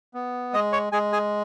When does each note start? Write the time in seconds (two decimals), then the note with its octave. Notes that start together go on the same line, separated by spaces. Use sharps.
0.14 B3
0.53 G#3 D#5 D#6
0.73 C#5 C#6
0.92 G#3 G#4 G#5
1.12 G#4 G#5